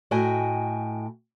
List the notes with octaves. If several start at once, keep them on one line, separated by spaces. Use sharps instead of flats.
A2 F#4 D#5 G5 G#5